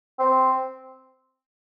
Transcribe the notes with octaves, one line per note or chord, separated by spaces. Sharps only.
C4